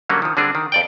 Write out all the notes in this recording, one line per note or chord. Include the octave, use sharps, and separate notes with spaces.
D3 F#3 G3 A#3 C#4
D#3 F3
D3 G3 C4 D4 G#4
D#3
F2 D5 G5